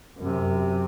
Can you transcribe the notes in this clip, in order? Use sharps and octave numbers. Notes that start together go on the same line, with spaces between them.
F#2 C3